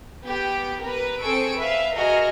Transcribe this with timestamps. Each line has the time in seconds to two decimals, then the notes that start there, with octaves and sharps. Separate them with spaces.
0.24 B3 G4
0.82 A#4 B4
1.20 C4 G#4 A4 C#6 E6 D7
1.58 B4 E5 F5
1.95 F#4 G#4 A#4 D#5 F6